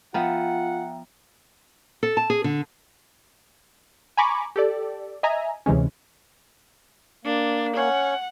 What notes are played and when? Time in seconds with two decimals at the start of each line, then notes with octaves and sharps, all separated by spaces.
0.14 F3 B3 F4 E5 F#5 G5 A#5
2.03 A4
2.17 A5
2.30 G#4
2.44 D3
4.17 G#5 A#5 B5 C#6 D6
4.56 G4 A4 D5
5.23 D#5 E5 G#5 A#5
5.66 D2 C3 E3 G#3 C#4
7.25 A#3 D4
7.77 C#4 C#5 F#5